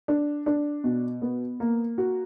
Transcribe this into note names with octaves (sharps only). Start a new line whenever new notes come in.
D4
D4
B2
B3
A#3
F#4